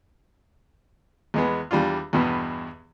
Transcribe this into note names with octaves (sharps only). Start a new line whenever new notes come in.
E2 G#3 B3
E2 G3 D4 F4
E2 G2 B2 B3